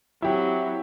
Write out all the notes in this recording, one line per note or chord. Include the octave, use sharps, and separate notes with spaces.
F#3 C4 E4 G4